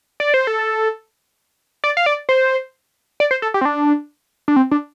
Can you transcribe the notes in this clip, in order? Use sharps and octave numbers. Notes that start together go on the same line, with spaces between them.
D5
C5
A4
D5
F5
D5
C5
D5
C5
A4
G4
C4
D4
D4
C4
D4